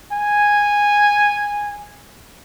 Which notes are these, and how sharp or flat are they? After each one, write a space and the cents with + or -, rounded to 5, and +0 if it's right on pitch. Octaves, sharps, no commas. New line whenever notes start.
G#5 -10